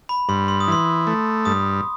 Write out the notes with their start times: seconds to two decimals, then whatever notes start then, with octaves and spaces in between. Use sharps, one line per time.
0.09 B5
0.29 G2 C6
0.48 C6
0.60 D#6
0.68 E3 C6
1.07 A3
1.45 G2 D#6